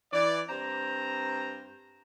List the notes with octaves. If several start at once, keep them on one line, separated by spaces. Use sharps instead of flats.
E3 D5
G2 C4 C5 A#5